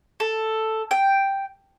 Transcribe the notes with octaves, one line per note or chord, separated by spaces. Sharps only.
A4
G5